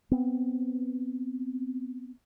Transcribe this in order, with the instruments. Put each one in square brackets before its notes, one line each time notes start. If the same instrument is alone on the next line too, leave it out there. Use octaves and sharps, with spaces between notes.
[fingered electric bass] B3 C4